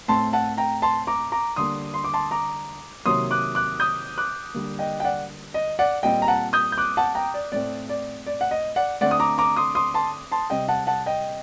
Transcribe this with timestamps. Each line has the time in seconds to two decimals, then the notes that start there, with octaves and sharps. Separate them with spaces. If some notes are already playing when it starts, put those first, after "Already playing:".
0.08 A2 A3 C4 A5 C6
0.33 F#5 A5
0.58 G5 A#5
0.82 A5 C6
1.07 A#5 D6
1.32 A#5 D6
1.56 D3 G3 A#3 C6 D#6
1.94 C6
2.04 D6
2.14 A5 C6
2.31 A#5 D6
3.06 C3 D#3 F#3 A#3 C6 D#6
3.31 D6 F#6
3.55 D6 F#6
3.80 D#6 G6
4.18 D6 F#6
4.54 D3 G3 A#3
4.79 D#5 G5
5.00 G5
5.04 D5 F#5
5.54 D#5
5.79 D5 F#5
6.03 A#2 G3 C4 D#5 G5
6.22 A#5
6.28 F#5 A5
6.53 D#6 G6
6.72 G6
6.78 D6 F#6
6.97 F#5 A5
7.15 G5 A#5
7.34 D5
7.52 A2 A3 C4 D5
7.89 D5
8.27 D5
8.41 F#5
8.51 D#5
8.76 D5 F#5
9.01 D3 A3 C4 D5 F#5
9.11 D#6
9.20 A#5 D6
9.38 A#5 D6
9.56 C6 D#6
9.75 C6 D#6
9.94 A5 C6
10.32 A5 C6
10.50 C3 G3 C4 D#5 G5
10.68 F#5 A5
10.87 F#5 A5
11.06 D#5 G5